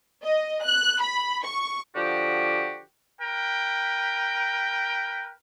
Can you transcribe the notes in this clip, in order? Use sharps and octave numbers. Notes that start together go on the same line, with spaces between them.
D#5
F#6
B5
C#6
D3 F3 F#4 G4
A#4 B4 G5